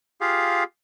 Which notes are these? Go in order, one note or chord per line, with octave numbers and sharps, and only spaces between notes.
F4 G4 G#4 F5